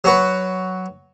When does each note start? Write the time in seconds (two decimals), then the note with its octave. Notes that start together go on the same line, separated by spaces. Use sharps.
0.04 F#3 F#4 B4